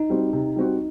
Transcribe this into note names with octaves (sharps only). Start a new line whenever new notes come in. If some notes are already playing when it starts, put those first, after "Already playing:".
Already playing: D#4
G3 C4 F#4
C3
G3 C4 F#4